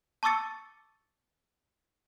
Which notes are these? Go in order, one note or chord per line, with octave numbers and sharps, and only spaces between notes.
A5 C#6 D6 E6 A6 C#7